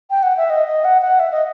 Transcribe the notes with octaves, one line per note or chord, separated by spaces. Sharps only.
G5
F#5
E5
D#5
D#5
F#5
F#5
E5
D#5